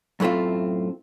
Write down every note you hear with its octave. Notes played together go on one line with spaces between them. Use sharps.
F#2 A2 A3 C4 F4